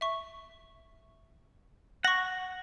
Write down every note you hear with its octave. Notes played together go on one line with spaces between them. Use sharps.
E5 C#6
F#5 C#6 A#6